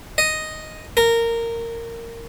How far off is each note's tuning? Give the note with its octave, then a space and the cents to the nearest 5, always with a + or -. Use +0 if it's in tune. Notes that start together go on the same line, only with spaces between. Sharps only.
D#5 +0
A#4 -15